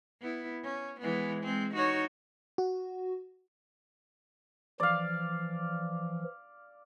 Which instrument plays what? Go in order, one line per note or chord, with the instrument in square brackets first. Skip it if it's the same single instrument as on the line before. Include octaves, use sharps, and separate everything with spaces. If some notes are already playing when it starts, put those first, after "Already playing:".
[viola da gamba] B3 E4
C#4
E3 G#3 B3
G#3 C4
D#4 F#4 C#5
[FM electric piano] F#4
[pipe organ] E3 F3 [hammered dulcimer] D5 F5